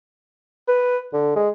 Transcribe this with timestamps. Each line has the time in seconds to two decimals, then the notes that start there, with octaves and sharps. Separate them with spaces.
0.68 B4
1.14 D3
1.36 G#3